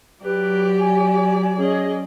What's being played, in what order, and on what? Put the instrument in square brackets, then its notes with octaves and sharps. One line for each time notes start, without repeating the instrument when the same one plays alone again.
[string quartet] F#3 D5 [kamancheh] G4 [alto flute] B4
[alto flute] G#5
[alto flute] C#4 [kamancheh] G#4 D#5